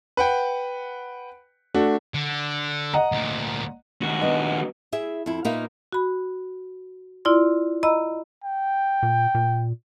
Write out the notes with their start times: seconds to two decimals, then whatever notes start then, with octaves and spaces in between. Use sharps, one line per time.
0.17 B4 F#5 G5
1.74 A3 D4 F#4
2.14 D3
2.93 D#5 F#5 A#5
3.12 D2 A#2
4.02 D#2 F#4
4.21 B3 D4 D#5
4.92 E4 G#4 E5
5.26 F2 E4
5.45 A#2 A#3 D#4 B4 E5 F5
5.93 F#4 B5
7.25 E4 F4 D5 C6
7.83 D#5 A#5 B5 E6
8.44 G5
9.03 A#2
9.35 A#2